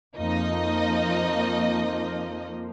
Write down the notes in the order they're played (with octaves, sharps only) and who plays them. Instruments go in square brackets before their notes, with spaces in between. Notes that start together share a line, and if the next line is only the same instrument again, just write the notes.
[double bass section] F2 F3 A#3 [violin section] D#4 D#5